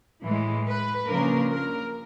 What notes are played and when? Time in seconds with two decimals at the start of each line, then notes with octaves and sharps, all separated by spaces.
0.25 A2 E3 G#3
0.67 B4
1.08 C#3 F3 A#3 D4 A#4
1.50 A#4